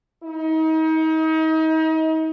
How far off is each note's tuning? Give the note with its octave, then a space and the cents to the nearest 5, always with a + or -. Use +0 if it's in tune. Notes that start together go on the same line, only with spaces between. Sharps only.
D#4 +35